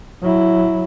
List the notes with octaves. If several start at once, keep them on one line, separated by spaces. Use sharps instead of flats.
F#3 E4